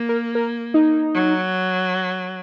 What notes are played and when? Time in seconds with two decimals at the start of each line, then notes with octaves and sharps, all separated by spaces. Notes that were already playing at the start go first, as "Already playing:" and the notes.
Already playing: A#3
0.09 A#4
0.35 A#4
0.74 D#4
1.14 F#3